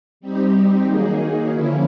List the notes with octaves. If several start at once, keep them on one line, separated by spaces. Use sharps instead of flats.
G3 C4 D#4 G4
D#3 F#3 A#3 D#4 G#4
D3 F3 A#3 C#4 E4